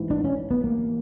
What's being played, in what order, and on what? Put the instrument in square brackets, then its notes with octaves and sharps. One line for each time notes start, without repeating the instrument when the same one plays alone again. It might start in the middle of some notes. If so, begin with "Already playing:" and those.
Already playing: [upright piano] A1 G#2 E3
[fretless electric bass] D4
C#4
B3
A#3